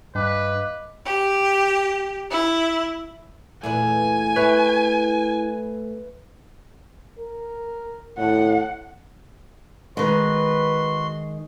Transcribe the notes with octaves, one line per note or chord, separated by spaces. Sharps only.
G2 B4 D#5 F5 D6
G4
E4
E2 A#2 A3 B4 G#5
E4 B4 C#5
A#4
A2 F#5
D#3 G#3 F#4 B4 C6